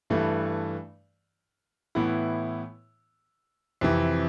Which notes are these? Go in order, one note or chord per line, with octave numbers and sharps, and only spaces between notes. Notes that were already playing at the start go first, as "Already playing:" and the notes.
G2 E3 A3
A2 E3 B3 E4
F2 C3 E3